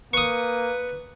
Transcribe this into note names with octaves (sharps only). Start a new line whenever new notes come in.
A#3 B4 C#6 D#6